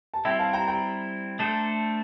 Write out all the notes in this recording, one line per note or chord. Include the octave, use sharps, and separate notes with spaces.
A5
G3 C4 E4 E5 G5
F5 A5
G5 A#5
G5 A#5
A3 D4 A4 C5